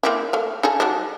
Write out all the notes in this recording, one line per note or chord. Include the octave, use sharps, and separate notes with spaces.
A#3 C4 E4
A3 F5
D#4 G#4 A4
F#3 G3 D4